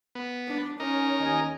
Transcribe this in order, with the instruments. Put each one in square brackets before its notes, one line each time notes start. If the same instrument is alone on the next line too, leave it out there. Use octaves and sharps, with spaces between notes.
[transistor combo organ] B3
[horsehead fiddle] D4
[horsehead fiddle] C#4 [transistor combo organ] D#4 A#4
[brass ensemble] D#2 D#5 G#5